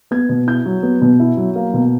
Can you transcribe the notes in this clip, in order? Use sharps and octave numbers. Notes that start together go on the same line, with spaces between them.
B3 G#6
B2
E4 G6
F#3
B3
B2
E4
F#3
A#3
B2